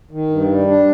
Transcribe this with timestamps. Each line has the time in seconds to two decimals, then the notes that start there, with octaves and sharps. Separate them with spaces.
0.11 D#3
0.30 G2
0.49 G3
0.68 D4